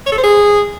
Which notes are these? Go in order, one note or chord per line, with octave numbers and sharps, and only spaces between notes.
C#5
A4
C5
G#4